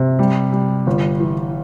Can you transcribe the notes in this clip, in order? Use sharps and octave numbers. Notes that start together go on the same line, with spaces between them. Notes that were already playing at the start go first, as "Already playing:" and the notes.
Already playing: C3
G3
G3
G1
E3